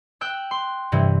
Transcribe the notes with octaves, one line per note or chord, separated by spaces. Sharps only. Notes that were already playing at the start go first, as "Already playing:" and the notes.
G5 E6 F#6
C6
G2 C3 E3